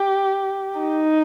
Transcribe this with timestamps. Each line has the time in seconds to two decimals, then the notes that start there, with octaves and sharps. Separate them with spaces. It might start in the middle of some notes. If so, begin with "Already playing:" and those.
Already playing: G4
0.80 D#4